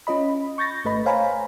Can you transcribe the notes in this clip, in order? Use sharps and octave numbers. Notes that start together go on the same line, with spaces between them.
C#4 F4 D#5 B5
C#6 G6 A6 A#6
G#1 A3 B4 D#5 B5
C5 C#5 F5 G#5 A#5 B5